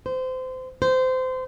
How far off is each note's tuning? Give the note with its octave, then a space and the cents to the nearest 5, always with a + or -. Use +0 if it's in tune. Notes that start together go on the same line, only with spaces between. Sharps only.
C5 -25
C5 -25